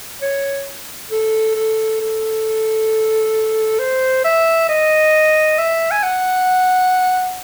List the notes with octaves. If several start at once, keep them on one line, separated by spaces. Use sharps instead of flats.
C#5
A4
A4
A4
C5
E5
D#5
E5
G#5
F#5